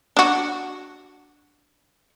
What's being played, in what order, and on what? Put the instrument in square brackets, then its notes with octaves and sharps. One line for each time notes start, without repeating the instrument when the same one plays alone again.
[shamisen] D4 F#4